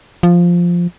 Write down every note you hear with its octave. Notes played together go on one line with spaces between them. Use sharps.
F3